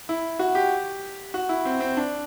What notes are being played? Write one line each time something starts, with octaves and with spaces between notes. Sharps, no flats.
E4
F#4
G4
F#4
E4
C4
C4
D4